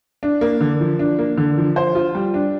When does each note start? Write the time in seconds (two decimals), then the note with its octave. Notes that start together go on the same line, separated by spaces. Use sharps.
0.23 D4
0.41 A#3
0.60 D3
0.80 F3
0.99 D4
1.19 A#3
1.37 D3
1.58 F3
1.76 C5
1.95 F4
2.15 G3
2.34 D4